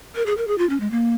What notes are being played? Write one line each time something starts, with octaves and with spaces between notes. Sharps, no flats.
A#4
G#4
A#4
G#4
F4
C#4
G#3
A#3